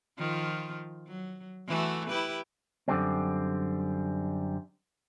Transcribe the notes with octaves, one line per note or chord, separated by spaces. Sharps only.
D#3 F3 F4
F#3
E3 A3 F#4
E4 G4 B4
F#2 D3 G3 C4